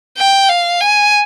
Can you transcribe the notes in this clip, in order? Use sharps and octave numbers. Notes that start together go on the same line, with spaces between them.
G5
F5
G#5